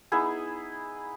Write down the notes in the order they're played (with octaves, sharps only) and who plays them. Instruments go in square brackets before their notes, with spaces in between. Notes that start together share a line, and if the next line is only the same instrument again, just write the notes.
[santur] B3 D#4 E4 G#4